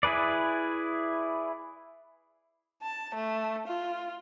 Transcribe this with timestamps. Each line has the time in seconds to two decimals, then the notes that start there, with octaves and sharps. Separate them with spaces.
0.03 E4 G#4 B4 D5
2.83 A5
3.15 A3
3.68 F4